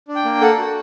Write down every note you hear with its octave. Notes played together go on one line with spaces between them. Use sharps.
D4
G5
A#3
A4 F#5
F#4